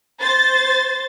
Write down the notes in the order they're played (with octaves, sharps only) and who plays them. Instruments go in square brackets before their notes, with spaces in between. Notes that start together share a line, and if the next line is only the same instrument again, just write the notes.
[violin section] C5 A6